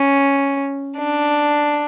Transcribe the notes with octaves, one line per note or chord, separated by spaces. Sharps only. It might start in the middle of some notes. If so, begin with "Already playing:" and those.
Already playing: C#4
D4